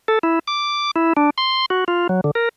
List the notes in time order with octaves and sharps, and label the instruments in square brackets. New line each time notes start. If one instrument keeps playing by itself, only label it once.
[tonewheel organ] A4
E4
D6
E4
D4
C6
F#4
F4
F#3
D3
A#4